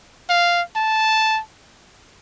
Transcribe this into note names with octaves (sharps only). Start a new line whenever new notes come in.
F5
A5